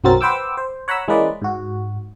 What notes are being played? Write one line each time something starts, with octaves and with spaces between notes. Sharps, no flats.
B1 F#2 F#3 C4 A#4 A6
B4 C5 F#5 G5 D6 E6
C5
C#5 F#5 A#5 B5 E6
E3 G#3 A#3 C#4 B4 D5
G#2 F#4